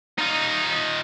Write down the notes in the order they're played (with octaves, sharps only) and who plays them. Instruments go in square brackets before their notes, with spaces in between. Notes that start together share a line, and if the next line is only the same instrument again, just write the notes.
[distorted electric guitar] D#4 F4